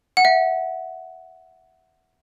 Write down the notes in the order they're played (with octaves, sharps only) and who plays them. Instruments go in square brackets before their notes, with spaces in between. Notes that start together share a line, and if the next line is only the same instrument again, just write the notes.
[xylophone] F#5
E5